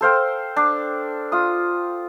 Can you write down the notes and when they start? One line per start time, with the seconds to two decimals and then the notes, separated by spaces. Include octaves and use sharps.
0.01 A4 C5 F5 G5
0.56 D4
1.32 F4 D#6